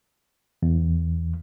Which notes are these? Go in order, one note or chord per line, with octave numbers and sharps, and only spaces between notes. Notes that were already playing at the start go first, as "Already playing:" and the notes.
E2